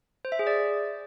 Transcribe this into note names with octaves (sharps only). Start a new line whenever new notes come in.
C5
E5
G#4
D5